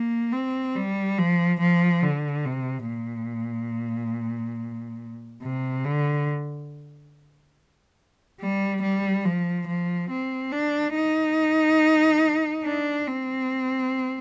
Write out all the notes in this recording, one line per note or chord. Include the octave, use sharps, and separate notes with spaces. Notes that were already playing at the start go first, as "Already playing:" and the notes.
Already playing: A#3
C4
G3
F3
F3
D3
C3
A#2
C3
D3
G3
G3
F3
F3
C4
D4
D#4
D4
C4